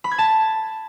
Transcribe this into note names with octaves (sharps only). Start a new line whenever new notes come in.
B5
G#6
A5